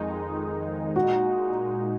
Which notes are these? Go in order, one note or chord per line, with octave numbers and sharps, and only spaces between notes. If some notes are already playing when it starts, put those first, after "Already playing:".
Already playing: F2 D#3 G#3 D#4 G#4
A#2 G#3 D#4 F#4